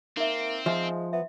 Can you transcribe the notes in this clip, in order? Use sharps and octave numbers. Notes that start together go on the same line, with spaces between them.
A#3 C4 D#4 E5
F3 G#3 E5 G#5
B3 E5